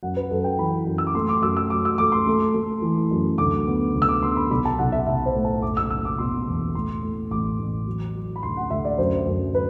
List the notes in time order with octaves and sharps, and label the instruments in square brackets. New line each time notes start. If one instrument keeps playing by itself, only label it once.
[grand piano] F#2 F#5
B4
F#2 A4
G5
E3 B5
F#2
E6
D6
A3 C6
D6
F#2 E6
E6
F#3 D6
E6
A3 D6
C6
A3
A3
E3
F#2
D2 D6
B3
D2
E6
D6
B3 C6
B5
B1 B5
A5
B1 F#5
E5
B1 E5
C5
A2
A5
F#1 D6
E6
F#1 E6
D6
B2 C6
E2
A2 C6
A2
A1 D6
A1
F#3
F#3
B5
D2 C6
F#5
D2 E5
D5
F#2 C5
F#2
B4